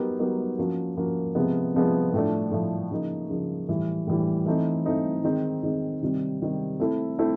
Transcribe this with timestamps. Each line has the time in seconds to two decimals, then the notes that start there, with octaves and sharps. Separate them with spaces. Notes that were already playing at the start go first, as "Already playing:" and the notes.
Already playing: F#3 B3 D#4 G4 A#4
0.19 F#3 B3 D#4 G4 A#4
0.58 F3 A#3 C#4 F#4 A#4
0.97 F3 A#3 C#4 F#4 A#4
1.35 C3 F3 G#3 B3
1.74 C3 F3 G#3 B3
2.13 A2 F3 A3 D4
2.51 A2 F3 A3 D4
2.91 C#3 F3 A#3 D#4
3.30 C#3 F3 A#3 D#4
3.69 A2 E3 G3
4.07 A2 E3 G3
4.46 E3 A3 C4 D#4
4.85 E3 A3 C4 D#4
5.24 D#3 G#3 C4 D#4
5.63 D#3 G#3 C4 D#4
6.01 C3 D#3 G3 C4
6.40 C3 D#3 G3 C4
6.79 A3 C4 E4 A4
7.18 A3 C4 E4 A4